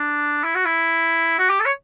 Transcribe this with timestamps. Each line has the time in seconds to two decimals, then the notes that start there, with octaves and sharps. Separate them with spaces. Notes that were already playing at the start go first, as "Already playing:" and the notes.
Already playing: D4
0.44 E4
0.55 F#4
0.65 E4
1.39 F#4
1.49 G4
1.60 A4
1.66 C#5